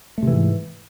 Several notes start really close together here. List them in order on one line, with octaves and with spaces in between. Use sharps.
A3 C3 E3 G#2